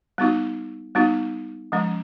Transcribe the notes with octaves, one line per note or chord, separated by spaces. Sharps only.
G3 B3 D#4 F#4
G3 B3 D#4 F#4
F3 G#3 C#4